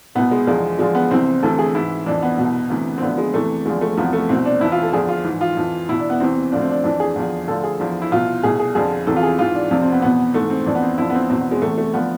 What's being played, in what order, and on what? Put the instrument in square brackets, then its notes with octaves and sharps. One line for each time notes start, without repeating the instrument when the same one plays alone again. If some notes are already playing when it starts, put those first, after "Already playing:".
[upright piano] C2 B2 B3
G#3
E2 D3 F3 G#3
E2 D3 F3 G#3
B3
C2 C3 E3 C4
D2 C3 E3 A4
G#4
G#2 E3 E4
F2 E3 D4
B3
C2 B2
D2 C3 E3
C4
D2 D3 F3 B3
G#3
E2 C3 E3 A3
E2 D3 F3 G#3
A3
E2 C3 F3 B3
A3
C2 B2 C4
D4
F2 E3 E4
F4
A4
E2 D3 F3 G#4
F4
G#2 E3
F4
F2 E3
E2 B2 E4
D4
B3
E2 C3 E3 C4
D2 D3 F3 D4
C4
D4
F2 E3 D4
G#4
E2 D3 F3
D2 D3 F3 A4
G#4
E2 D3 F3
E4
C2 B2 F4
C2 B2 G#4
G#4
F2 D3 F3 G#4
E2 C3 E3 A4
F4
G#4
G#2 E3 F4
D4
F2 C3 F3 D4
C4
B3
E2 B2 B3
G#2 E3 A3
C4
F2 E3 D4
B3
C4
F2 D3 F3 E4
B3
C4
E2 B2 C4
B3
G#3
E2 C3 E3 A3
A3
D3 F3 B3